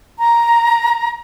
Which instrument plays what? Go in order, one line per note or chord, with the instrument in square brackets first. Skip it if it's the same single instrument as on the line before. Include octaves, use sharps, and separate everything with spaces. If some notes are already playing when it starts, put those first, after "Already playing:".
[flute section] A#5